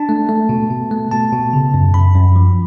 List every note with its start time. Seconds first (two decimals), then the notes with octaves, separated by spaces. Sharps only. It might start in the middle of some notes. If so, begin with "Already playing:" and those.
Already playing: D4 A5
0.09 A3
0.29 A3
0.49 B2
0.70 B2
0.91 A3
1.11 B2 A5
1.33 B2
1.53 C#3
1.74 F#2
1.94 F#2 B5
2.15 F#2
2.36 F3